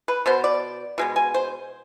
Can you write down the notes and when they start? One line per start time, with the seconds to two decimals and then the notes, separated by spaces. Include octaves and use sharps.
0.08 B4
0.26 B2 B3 C5
0.44 D5
0.98 B2 G#3 B3
1.16 G#5
1.34 C5